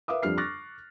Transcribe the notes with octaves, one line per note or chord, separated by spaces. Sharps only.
A#4 B4 E5 F5 D6 D#6
F2 G3 D4 F6 C7
C#6 D6 F6 F#6 A6 A#6